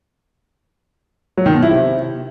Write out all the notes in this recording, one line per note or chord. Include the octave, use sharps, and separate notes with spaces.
F#3
D#3
B2
E4
C3